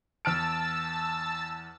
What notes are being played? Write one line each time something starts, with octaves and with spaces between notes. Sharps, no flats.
E2 A5 E6 F6 A6 D7